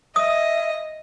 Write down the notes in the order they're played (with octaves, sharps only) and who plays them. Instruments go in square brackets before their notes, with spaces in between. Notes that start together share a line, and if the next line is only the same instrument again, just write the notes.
[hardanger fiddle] D#5 [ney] E5 [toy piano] D#6